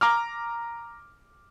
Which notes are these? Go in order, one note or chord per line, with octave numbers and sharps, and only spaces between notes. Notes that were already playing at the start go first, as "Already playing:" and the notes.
A#5 D6 F6